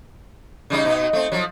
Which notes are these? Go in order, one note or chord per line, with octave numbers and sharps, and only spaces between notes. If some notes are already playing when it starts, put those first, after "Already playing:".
C#3 G3 D#4
B2 D#4
A3 C4
F3 F#3